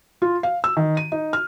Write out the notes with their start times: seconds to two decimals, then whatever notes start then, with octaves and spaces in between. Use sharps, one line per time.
0.22 F4
0.43 F5
0.64 E6
0.77 D#3
0.97 D#7
1.12 D#4
1.33 F6